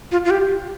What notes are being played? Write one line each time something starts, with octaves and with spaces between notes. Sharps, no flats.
F4
F4
G4